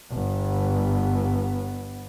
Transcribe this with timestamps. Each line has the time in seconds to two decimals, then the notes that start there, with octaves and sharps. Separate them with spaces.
0.11 G1 B3